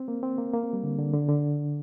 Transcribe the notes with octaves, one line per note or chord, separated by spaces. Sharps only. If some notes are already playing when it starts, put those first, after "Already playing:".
Already playing: C4
A#3
C4
A#3
A#3
C4
G3
D3
D3
D3
D3